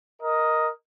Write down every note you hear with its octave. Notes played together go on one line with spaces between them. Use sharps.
A#4 D#5